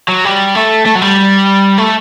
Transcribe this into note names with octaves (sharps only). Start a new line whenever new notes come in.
F#3
G3
A3
A3
F#3
G3
A3